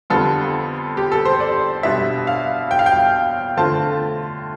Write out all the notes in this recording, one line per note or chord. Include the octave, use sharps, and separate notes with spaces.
F2 D3 G3 B3 F4 A4
G4
A4
C5
D5
B2 G3 B3 D4 E5
F5
G5
F5
G5
D3 A3 C4 F4 A5